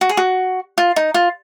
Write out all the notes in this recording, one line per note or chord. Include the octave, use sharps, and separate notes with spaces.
F#4
G#4
F#4
F4
D#4
F4